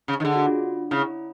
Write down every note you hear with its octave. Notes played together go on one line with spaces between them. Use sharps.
C#3
D#3
D3 G#4
F#4
F4
C#3 E4